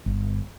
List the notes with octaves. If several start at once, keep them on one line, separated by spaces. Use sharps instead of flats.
G1